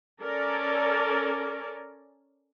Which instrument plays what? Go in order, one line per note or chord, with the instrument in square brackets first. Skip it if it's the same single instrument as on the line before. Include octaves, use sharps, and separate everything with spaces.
[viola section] C#4 A4 A#4 D5